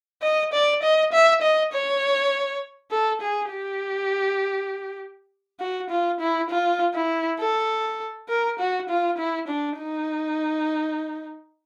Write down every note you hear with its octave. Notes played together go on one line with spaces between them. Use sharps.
D#5
D5
D#5
E5
D#5
C#5
A4
G#4
G4
F#4
F4
E4
F4
E4
A4
A#4
F#4
F4
E4
D4
D#4